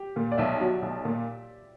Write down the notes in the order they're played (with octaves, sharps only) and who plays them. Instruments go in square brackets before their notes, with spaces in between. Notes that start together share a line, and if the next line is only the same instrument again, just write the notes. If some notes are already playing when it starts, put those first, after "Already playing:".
Already playing: [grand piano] G4
[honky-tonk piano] A#2
[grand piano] D5
[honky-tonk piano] B1 [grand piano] E5
[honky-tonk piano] F#3
B1
A#2